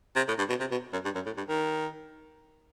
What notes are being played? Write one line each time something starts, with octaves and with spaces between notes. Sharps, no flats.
C3
A2
G2
B2
C3
B2
F#2
G2
F#2
A2
G2
D#3